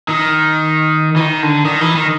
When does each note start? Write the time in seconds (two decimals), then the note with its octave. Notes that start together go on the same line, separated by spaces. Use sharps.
0.08 D#3
1.16 E3
1.20 D#3
1.43 D3
1.65 D#3
1.81 E3
1.96 D#3